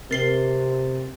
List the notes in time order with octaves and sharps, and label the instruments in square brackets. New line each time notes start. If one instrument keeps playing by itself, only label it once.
[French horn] C3 [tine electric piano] C4 A6 [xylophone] A#4 C7 G7